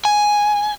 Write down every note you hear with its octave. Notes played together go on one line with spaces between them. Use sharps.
G#5